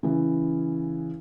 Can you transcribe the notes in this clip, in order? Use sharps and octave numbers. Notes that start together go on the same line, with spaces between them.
C#3 E3